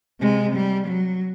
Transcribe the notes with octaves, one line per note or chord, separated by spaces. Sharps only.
C3 G#3
G3
F#3